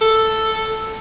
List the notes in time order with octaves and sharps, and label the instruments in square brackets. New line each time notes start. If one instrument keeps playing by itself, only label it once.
[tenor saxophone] A4